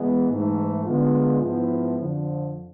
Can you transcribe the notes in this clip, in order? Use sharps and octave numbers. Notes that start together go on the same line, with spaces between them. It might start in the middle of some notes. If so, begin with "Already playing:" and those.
Already playing: E3 G#3 B3
G#2 E3 A3
D3 G#3 B3 F4
G#2 F3 B3 E4
F2 D3 F3